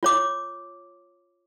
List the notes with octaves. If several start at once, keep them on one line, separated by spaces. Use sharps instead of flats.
F4 C#5 D6